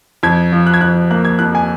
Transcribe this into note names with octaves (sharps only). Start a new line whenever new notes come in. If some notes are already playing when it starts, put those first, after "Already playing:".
F2 G#6
F3
F#6
G#6
F2 F#6
A#3 F#6
G#6
F2 F#6
G#5